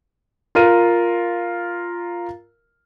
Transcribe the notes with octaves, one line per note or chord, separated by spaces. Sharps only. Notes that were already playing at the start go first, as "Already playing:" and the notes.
F4 A#4 D#7